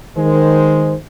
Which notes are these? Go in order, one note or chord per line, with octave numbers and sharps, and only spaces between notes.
D#3 G#3 C5